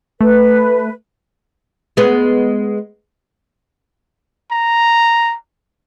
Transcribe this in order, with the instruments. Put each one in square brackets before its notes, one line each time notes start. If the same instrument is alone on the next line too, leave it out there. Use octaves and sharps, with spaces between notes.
[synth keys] A3 [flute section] B4
[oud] G#3 B3
[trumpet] A#5